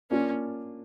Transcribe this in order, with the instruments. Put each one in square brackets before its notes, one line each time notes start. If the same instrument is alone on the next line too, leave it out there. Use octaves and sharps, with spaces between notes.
[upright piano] A#3 D4 F4 [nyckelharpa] C#4